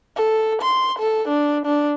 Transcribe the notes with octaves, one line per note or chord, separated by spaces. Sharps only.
A4
C6
A4
D4
D4